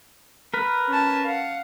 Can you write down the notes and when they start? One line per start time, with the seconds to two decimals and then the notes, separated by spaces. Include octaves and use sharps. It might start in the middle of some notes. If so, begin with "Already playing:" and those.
0.54 A#4 B4
0.89 C#4 A5
1.24 F5 F#5